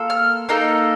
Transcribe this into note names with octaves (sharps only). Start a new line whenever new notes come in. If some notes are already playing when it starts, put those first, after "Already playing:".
Already playing: A#3 F4 A4
F6
A#3 D#4 A4